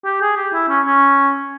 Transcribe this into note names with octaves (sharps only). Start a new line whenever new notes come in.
G4
G#4
G4
E4
C#4
C#4